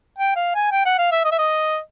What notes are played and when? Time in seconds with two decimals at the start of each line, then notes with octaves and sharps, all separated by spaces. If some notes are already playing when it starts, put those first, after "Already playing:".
0.19 G5
0.36 F5
0.55 G#5
0.72 G5
0.86 F#5
0.99 F5
1.11 E5
1.25 D#5
1.32 E5
1.39 D#5